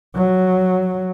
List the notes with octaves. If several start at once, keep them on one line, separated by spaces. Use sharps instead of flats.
F#3